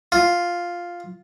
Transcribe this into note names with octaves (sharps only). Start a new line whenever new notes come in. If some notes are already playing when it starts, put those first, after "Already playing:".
F4